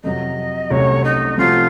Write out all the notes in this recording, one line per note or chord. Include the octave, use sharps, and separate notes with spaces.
F2 C3 F#3 D#5
C2 C3 F#3 A3 C#4 C#5
D#4
C3 F3 A3 C4 F4 F#4